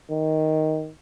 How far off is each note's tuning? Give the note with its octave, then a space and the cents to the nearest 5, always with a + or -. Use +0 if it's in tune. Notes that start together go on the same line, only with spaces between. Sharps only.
D#3 +10